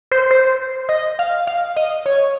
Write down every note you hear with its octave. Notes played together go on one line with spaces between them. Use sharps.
C5
C5
D#5
F5
F5
D#5
C#5